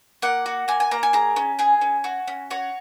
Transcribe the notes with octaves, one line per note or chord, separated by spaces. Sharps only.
A#3 F#5
F#4
A#3 G#5
G#5
A#3 A#5
G#5
G#4 A#5
C#4
G#4 G#5
C#4
F#4
C#4
F#4 C#5